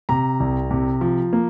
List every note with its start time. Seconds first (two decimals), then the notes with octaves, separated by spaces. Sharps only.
0.09 C3 A#5
0.40 C2
0.71 C3
1.01 F3
1.33 A#3